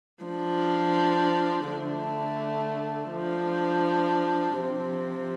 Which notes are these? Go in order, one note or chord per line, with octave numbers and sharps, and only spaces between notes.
F3 D4
D3 A3 D4
F3 D4
C3 F3 C4